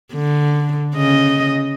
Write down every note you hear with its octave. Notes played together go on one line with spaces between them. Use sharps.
D3
C#3 D#5